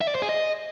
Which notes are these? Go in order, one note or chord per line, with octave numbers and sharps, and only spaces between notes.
E5
D5
C5
G#4
D#5